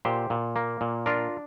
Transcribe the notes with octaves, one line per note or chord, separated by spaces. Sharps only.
A#2 G4 C5
A#2
A#3
A#2
D4 F4 A#4